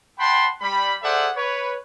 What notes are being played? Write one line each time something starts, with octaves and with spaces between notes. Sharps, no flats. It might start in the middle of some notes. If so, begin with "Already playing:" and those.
F#5 G5 A5 B5 C6
G3 B5
G#4 A4 C5 D5 E5 F#5
B4 C#5